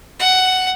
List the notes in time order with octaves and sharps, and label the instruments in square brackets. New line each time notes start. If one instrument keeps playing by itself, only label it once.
[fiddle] F#5